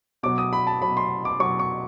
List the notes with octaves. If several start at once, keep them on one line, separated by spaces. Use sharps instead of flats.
B2 F#3 D6
D#6
B5
A5
B2 F#3 B5
C6
D6
B2 F#3 C#6
C#6